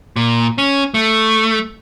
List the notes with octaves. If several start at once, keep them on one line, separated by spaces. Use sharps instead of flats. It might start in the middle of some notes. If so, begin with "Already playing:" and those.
A#2
C#4
A3